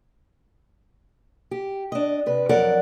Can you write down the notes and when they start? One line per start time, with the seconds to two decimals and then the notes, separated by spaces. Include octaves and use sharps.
1.51 G4
1.92 D4 D#5
2.26 C3 B4
2.49 F2 F#3 A#4 D5 F#5